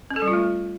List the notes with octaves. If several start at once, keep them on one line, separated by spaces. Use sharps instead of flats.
C#4
A4
G3
F4
A3